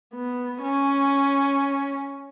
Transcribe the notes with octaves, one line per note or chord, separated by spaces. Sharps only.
B3
C#4